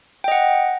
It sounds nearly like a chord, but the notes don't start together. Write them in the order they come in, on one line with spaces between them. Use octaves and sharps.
G5 D#5 F#5